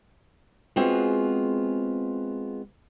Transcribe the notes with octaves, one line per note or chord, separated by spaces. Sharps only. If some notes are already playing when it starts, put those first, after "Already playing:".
G#3 B3 C4 F4 F#4 G#4